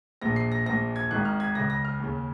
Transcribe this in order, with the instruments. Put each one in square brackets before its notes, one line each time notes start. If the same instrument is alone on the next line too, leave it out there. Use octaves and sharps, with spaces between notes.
[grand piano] A#1 A#2 A#6
C7
A#6
A#1 A#2 A#6
G#6
G#1 G#2 D#3 F#6
F6
G#6
C#2 C#3 A#6
A#6
F6
D#2 C#3